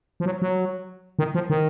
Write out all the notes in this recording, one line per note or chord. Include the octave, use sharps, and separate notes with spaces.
F3
F#3
F#3
D#3
F3
D#3